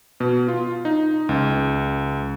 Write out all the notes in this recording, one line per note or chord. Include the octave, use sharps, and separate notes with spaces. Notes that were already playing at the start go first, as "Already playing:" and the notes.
B2
F4
D#4
C#2